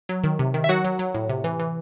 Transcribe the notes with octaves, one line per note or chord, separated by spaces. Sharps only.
F#3
D#3
C3
D#3
E5
F#3 F#4 F#5
F#3
F#3
A2
C3
E3
E3